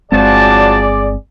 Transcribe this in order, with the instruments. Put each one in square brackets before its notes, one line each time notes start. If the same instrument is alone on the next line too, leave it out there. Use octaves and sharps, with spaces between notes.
[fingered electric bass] G1 G#3 C4 [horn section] F3 F#3 A5 [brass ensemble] G#4 D5